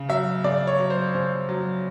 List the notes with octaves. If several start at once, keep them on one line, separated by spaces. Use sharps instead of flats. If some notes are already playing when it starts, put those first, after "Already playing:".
Already playing: C#3
F#3 E5
C#3 D5
C#5
F#3
C5
C#3 C5
F#3